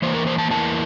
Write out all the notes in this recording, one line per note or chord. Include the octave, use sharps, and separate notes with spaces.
E2 E3 A#3 C5
A#4
C5
A5
E2 E3 A#3 A5